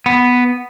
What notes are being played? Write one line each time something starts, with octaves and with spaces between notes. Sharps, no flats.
B3